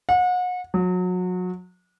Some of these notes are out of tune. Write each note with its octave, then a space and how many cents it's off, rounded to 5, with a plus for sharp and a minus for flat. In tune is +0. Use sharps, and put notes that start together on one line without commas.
F#5 -35
F#3 -30